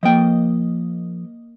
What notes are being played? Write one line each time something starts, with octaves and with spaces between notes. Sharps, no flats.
F3 A#3 D#5 G5